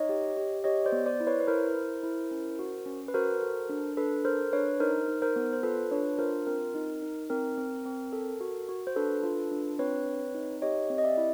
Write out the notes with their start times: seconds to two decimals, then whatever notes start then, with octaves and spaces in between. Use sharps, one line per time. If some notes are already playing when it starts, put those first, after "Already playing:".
Already playing: D#4 C#5 D#5
0.09 G4
0.37 G4
0.64 G4 C#5 D#5
0.85 C5 D5
0.92 B3
1.06 C5 D5
1.20 E4
1.27 B4 C#5
1.40 B4
1.47 E4 A#4 C5
1.75 E4
2.03 E4
2.31 C#4
2.59 F#4
2.86 C#4
3.08 B4
3.14 F#4 A#4 C5
3.42 A4
3.69 D4
3.97 D4 A4 B4
4.25 A4 A#4 C5
4.53 D4 B4 C#5
4.80 D#4 A#4 C5
5.08 D#4
5.22 A#4 C5
5.36 B3
5.53 C5
5.63 F4 A4 B4
5.91 D4 B4 C#5
6.19 F4 A#4 C5
6.47 C4 A#4
6.74 D#4
7.03 D#4
7.30 C4 A#4
7.58 C4
7.85 C4
8.13 A4
8.41 F#4
8.69 F#4
8.87 C5
8.96 D4 A4 B4
9.23 F4
9.51 D4
9.79 C4 B4 C#5
10.07 C4
10.35 D#4
10.62 G4 C#5 D#5
10.90 C4
10.98 D#5
11.04 D5 E5
11.17 E4